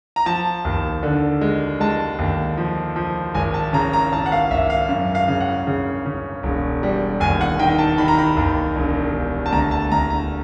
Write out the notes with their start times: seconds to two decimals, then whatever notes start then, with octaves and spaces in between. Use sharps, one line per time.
0.16 A#5
0.26 F3 A5
0.65 D#2
1.03 D3
1.41 G#3
1.80 G#3 A5
2.19 D#2
2.57 F3
2.96 F3
3.34 G#1 G#5
3.54 A5
3.73 C#3 A#5
3.93 A#5
4.12 G#1 A5
4.26 F#5
4.32 F5
4.51 G#1 E5
4.70 F5
4.89 F#2
5.15 F5
5.28 C#3
5.40 F#5
5.67 C#3
6.06 C#3
6.43 E1
6.83 G3
7.20 D#2 G#5
7.41 F#5
7.59 D#3 G5
7.78 A5
7.98 D#3 B5
8.08 A#5
8.18 B5
8.37 D#2
8.76 E1
9.14 E1
9.46 A5
9.52 D2 A#5
9.71 A5
9.92 D2 A#5
10.10 A#5